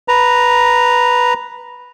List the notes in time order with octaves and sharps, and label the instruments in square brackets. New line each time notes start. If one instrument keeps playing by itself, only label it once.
[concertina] B4 A#5